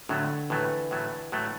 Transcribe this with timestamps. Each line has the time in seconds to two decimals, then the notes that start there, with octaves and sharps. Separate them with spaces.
0.09 A2 D3 F#3 A3
0.50 A2 E3 F#3 A3
0.91 A2 F#3 A3
1.32 A2 F#3 A3